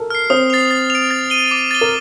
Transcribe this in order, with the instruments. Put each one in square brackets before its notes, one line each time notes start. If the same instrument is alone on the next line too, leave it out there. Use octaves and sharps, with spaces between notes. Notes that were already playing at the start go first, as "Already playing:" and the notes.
Already playing: [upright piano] A4 A#4
[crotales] F6 C7
[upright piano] C4 C5 [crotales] D#6
[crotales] A6 C7 F7
A6
D7 F7
A6
D#7 G7
D6
A6 D#7 G7
[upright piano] A#4